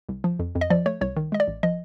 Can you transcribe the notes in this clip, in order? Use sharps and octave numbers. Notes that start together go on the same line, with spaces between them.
C2
F3
F2
F2
D#5
F3 D5
A3 C#5
C2 C#5
D#3
G#3 D#5
D5
A1
F3 D#5